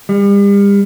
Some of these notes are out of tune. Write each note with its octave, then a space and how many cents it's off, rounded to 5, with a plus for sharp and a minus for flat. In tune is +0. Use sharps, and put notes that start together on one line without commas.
G3 +40